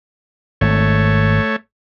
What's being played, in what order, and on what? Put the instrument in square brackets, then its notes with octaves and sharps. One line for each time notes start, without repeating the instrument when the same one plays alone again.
[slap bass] G#1 [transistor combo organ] A3 C#5